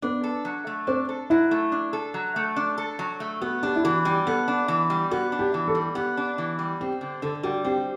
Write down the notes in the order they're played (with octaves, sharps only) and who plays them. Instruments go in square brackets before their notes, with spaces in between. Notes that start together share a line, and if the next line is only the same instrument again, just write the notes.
[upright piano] B3 [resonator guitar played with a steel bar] D4
[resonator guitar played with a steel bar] A4
F#3
A3
[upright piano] C4 [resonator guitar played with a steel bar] D4
[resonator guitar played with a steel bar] A4
[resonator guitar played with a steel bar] F#3 [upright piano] E4
[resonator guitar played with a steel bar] A3
D4
A4
F#3
A3
D4
A4
F#3
A3
[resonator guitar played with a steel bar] B3 [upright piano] F#4
[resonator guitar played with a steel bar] D4 [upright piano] G4
[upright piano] E4
[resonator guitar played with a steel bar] E3 [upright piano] F#4
[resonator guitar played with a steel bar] G3 [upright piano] G4
[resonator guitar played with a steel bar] B3 [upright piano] A4
[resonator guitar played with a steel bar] D4
E3
G3
[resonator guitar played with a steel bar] B3 [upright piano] F#4
[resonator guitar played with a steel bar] D4
[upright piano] G4
[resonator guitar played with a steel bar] E3
[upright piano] A4
[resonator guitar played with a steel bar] G3
[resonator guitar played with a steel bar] B3 [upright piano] G4
[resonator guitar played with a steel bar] D4
E3
G3
[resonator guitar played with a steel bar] C4 [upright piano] G4
[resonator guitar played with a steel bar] D3
[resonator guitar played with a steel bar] D3 [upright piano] A4
[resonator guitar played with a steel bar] G3 [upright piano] F#4
[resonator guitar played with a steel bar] C4 [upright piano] G4